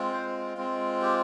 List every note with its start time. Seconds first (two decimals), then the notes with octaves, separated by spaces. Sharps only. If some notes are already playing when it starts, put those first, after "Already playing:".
Already playing: G#3 C4 F4
0.13 C5
0.57 G#3 C4 F4
1.02 G4